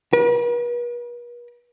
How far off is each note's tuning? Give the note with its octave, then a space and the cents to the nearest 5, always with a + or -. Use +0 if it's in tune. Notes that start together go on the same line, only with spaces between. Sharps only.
B4 -45